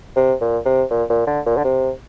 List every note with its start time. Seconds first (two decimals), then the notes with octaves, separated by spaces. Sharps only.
0.16 C3
0.41 A#2
0.66 C3
0.90 A#2
1.10 A#2
1.27 D3
1.46 A#2
1.57 D3
1.64 C3